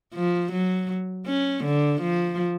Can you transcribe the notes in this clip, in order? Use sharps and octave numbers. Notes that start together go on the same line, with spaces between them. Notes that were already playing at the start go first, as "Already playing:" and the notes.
F3
F#3
C#4
D3
F3